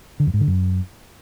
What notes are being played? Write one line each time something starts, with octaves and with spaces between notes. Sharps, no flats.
D3
F2
G#2
D3
F#2